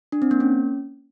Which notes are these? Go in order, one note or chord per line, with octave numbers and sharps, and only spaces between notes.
D4
C4
A#3
C#4